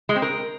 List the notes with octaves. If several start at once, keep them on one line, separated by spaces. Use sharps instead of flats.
G#3
C4
A#4